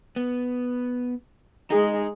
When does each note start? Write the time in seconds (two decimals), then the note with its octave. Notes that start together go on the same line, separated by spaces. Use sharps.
0.16 B3
1.70 G#3 D#4 G#4